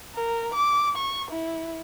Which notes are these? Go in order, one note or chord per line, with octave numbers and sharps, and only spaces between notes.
A#4
D6
C#6
E4